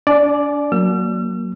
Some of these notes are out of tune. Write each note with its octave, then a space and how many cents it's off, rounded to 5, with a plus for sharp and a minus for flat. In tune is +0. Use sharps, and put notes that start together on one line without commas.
D4 -30 D5 +0 G#5 +40
F#3 +0 A#3 +0 E6 +45